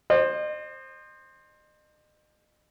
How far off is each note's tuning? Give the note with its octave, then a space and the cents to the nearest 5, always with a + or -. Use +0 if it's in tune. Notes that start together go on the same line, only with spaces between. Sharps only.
C5 +15 D#5 -40